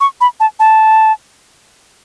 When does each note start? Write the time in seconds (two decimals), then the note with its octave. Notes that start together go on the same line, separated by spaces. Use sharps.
0.01 C#6
0.21 B5
0.40 A5
0.60 A5